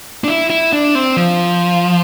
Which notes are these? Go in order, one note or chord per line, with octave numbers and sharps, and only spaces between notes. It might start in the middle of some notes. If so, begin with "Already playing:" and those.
D4
E4
E4
D4
C4
F3